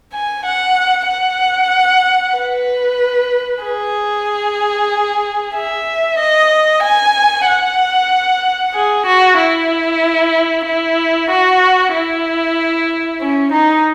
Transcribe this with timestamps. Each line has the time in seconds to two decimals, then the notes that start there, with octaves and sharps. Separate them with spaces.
0.13 G#5
0.45 F#5
1.08 F#5
2.36 B4
3.64 G#4
5.55 E5
6.19 D#5
6.83 G#5
7.46 F#5
8.74 G#4
9.06 F#4
9.38 E4
10.65 E4
11.30 F#4
11.93 E4
13.21 C#4
13.52 D#4